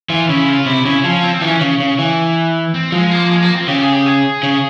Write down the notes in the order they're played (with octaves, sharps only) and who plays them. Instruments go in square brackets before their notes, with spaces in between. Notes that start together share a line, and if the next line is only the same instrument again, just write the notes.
[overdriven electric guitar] E3 [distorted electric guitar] F4
[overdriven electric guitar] C#3 [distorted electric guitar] E4
[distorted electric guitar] F4
[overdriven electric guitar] C3 [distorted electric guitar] E4
[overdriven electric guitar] C#3 [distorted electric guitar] E4
[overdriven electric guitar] F3 [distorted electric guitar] C#4
[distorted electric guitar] C4
[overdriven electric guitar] E3 [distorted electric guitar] C#4
[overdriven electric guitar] C#3
C#3
E3
[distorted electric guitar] C4
[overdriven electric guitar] F3 [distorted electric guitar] G#3
[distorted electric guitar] A#3
G#3
A#3
C4
[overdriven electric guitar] C#3 [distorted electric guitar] G4
[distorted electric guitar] G#4
G4
G#4
[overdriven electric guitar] C#3